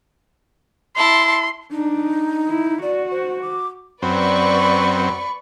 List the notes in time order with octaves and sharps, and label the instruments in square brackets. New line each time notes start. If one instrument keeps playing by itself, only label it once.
[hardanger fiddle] E4 A5 [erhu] C6
[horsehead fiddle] D4 [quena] D#4
[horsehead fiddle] E4
[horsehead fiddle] F#4 [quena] D5
[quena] C5
D6
[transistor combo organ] F#2 C4 [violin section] B4 D5 C#6 [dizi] B5